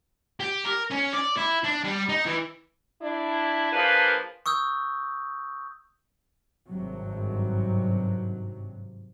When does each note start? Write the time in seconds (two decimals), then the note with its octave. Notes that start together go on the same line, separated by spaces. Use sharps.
0.40 G4
0.65 A#4
0.91 C#4
1.13 D5
1.38 E4
1.64 D4
1.84 G3
2.09 D#4
2.25 E3
3.02 D4 E4
3.72 F3 A#3 D4 G#4 B4
4.46 C#6 D#6 E6 G6
6.68 G#1 G2 C3 F#3